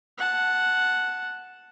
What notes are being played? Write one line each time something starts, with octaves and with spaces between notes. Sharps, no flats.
F#5 A5